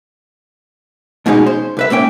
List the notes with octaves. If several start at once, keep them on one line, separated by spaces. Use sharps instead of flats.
G#2 B2 F3 G#3 C#4 D#4
C5
C2 B4 E5
G#2 A#3 C#4 G5